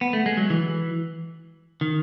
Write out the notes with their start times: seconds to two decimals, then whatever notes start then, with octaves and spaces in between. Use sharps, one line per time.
0.01 B3
0.13 A3
0.26 G#3
0.37 F#3
0.50 E3
1.81 D#3